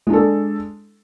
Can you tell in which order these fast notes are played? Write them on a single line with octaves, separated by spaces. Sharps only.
G#3 D4 A4